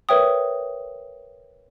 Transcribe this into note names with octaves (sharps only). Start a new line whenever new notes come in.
A#4 B4 C#5 E5 G5 D#6